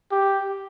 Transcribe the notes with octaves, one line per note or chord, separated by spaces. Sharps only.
G4